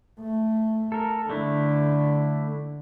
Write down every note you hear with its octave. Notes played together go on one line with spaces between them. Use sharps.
A3
A4 A#4
D3 A3 D4 E4